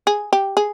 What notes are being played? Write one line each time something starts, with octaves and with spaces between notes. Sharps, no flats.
G#4
G4
G#4